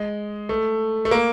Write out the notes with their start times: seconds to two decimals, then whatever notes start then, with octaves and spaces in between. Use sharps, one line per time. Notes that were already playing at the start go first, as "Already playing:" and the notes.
Already playing: G#3
0.49 A3
1.05 A3
1.11 A#3